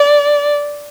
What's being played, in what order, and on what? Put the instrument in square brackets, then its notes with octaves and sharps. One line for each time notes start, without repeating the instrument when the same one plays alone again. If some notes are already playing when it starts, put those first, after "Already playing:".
Already playing: [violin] D5